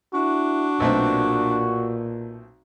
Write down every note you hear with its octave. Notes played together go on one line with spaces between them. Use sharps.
D4 E4 F#4
B1 A#2 A3 C4